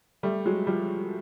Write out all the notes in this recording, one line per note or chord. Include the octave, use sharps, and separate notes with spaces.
G3 A3
F#3 G#3
F3 G3